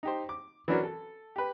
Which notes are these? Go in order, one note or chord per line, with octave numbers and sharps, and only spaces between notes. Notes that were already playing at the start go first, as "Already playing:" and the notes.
D#4 G4 C5
D6
E3 F#3 C#4 D4 F#4 A#4
A4
G4 B4